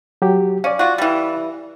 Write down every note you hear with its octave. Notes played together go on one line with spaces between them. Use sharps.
F#3 G4
C#4 D5 F5
F4 F#4
E3 G3